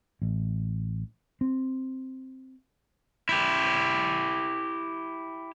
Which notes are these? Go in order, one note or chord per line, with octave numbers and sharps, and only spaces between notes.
A1
C4
E4 G4